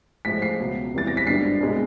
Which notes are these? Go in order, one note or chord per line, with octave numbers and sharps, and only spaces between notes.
A1 A2 F3 G#3 B6
C7
C#2 B2 F#3
E1 E2 C3 E3 G3 A6
A#6
B6
G#1 G2 D3 G3 C7
C2 B2 G#3